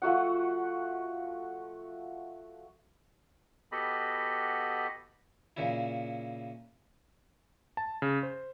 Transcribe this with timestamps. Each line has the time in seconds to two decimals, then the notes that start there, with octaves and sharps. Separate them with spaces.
0.02 F3 A3 F#4 F#5
3.72 B3 F#4 G4 A4 D#5 B5
5.57 A#2 C#3 E4
7.77 A5
8.02 C#3
8.23 C5